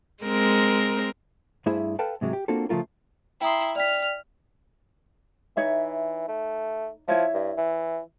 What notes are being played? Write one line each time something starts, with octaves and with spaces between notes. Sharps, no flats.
G#3 C4 A#4
G2 A3 E4 G#4 C5 E5
A4 B4 F5 G5 A5
G#2 C3 F#3 G#3
G4
A#3 C4 D4 F4 F#4 A4
C#3 F3 A3 F4 A#4
E4 G5 A#5 C6 D#6
D5 G5 F6 B6
E3 D#4 C#5 E5
A3
F3 E4 C#5 E5
G2
E3